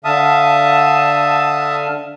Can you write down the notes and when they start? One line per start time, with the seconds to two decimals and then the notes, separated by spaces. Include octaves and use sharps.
0.05 D3 E5 F5 A5 D#6